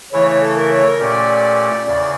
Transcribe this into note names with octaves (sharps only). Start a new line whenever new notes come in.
C#3 E3 A3 E4 C#5
C#5
A4
A#4
C#5
A#4
A#2 A3 C#4 G4 D5
E2 C#3 D5